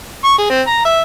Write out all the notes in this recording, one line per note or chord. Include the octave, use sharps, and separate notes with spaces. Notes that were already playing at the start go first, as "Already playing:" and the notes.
C#6
G#4
C4
A#5
E5